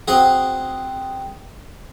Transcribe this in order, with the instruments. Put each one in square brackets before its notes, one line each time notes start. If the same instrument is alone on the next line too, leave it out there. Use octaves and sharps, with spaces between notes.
[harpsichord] C4 F#4 G#4